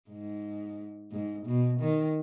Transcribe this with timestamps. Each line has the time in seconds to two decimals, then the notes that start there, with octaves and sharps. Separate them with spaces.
0.10 G#2
1.11 G#2
1.46 B2
1.80 D#3